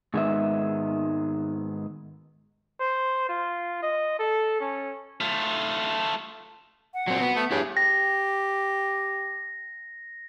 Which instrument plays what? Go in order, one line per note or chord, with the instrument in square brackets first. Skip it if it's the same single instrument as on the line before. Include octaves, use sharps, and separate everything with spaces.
[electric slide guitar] G#2 D#3 G#3 B3 E5
[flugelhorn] C5
F4
D#5
A4
C#4
[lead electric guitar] A3 F4
[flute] F#5
[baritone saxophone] A#2 [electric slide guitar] F#3 C4
[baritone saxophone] B2 [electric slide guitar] B3
[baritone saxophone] A3
[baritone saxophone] G2 [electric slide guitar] E4 G#4 [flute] C#5
[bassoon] G4 [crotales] A#6